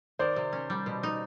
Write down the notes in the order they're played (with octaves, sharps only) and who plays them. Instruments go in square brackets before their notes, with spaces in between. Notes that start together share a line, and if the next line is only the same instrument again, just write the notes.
[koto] D#3 [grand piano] C5 D5
[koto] C3
C#4
G3
B2
D#4